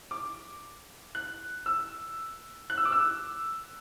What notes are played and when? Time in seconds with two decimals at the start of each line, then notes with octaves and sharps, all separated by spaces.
0.11 D6
1.15 F#6
1.66 E6
2.70 F#6
2.77 E6
2.85 D6
2.92 E6